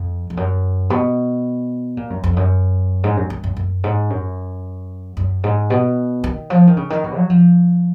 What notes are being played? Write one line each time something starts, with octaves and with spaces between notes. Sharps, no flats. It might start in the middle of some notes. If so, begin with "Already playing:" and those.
Already playing: F2
F2
F#2
B2
A#2
F#2
F2
F#2
G#2
F#2
F#2
F#2
F#2
G#2
F#2
F#2
G#2
B2
D#3
F3
D#3
C#3
D#3
B2
F#3
F3